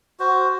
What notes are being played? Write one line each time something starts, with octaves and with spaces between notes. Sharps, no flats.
F#4 C5